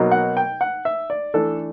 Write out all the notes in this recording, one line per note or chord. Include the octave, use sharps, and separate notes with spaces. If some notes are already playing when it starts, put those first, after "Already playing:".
Already playing: B2 F#3 A#3 D#4
F#5
G5
F#5
E5
D5
E3 A3 D4 A4